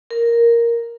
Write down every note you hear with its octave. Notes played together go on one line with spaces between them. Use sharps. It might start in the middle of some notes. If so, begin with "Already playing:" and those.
A#4